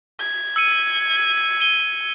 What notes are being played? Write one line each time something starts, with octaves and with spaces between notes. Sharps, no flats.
G#6
E6 C#7 D#7
D#7 G7